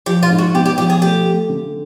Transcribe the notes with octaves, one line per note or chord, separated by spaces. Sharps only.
F3 G4
F4
G#2
F#4
B3 G4
G4
F3 G4
G#4
A3 G4
A3
D3